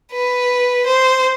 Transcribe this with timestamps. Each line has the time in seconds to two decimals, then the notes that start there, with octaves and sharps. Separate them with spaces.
0.13 B4
0.86 C5